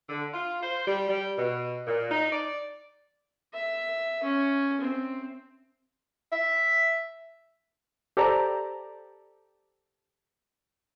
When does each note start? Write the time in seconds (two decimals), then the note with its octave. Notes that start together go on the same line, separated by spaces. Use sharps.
0.09 D3
0.33 F4
0.63 C5
0.87 G3
1.09 G3
1.38 B2
1.87 A#2
2.10 D#4
2.32 D5
3.54 E5
4.23 C#4
4.81 C4
6.32 E5
8.17 G4 A4 C5 D5 A#5